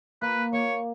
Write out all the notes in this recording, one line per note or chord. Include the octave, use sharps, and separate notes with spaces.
A#3 B4
A#3 C#5